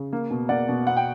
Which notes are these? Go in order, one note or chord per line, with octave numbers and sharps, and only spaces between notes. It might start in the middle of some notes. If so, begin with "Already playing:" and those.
Already playing: C#3
A#3
B2
A#3 D5 F#5
B2
B3 F#5
G5